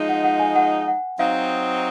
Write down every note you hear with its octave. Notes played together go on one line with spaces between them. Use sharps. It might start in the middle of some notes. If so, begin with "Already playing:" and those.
Already playing: F3 G#3 D#4
F#5
F#5
G#5
F#5
F#5
F#3 C4 D#4 F5